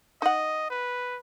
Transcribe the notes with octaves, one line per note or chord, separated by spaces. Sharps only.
D#4 D#5 F#5
B4